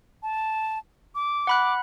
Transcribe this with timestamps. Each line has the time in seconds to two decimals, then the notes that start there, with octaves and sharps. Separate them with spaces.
0.23 A5
1.15 D6
1.47 F#5 B5 F#6